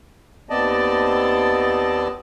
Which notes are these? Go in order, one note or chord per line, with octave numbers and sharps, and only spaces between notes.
D#2 B3 C4 D5 D#5 A5